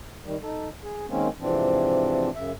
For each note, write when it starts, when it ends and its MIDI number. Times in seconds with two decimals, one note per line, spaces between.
0.24 0.36 51
0.24 0.36 55
0.42 0.69 63
0.42 0.69 69
0.84 1.06 68
1.08 1.28 51
1.08 1.28 56
1.08 1.28 58
1.08 1.28 60
1.08 1.28 61
1.41 2.30 44
1.41 2.30 48
1.41 2.30 52
1.41 2.30 53
1.41 2.30 60
1.41 2.30 62
2.35 2.52 42
2.35 2.52 49
2.35 2.52 76